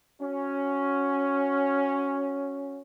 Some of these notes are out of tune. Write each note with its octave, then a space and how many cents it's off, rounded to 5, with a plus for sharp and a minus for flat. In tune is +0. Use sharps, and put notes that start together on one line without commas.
C#4 +0 F#4 +0